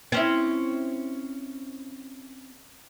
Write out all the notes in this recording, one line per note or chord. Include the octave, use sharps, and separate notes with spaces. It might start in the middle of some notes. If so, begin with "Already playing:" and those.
C4 C#4 E4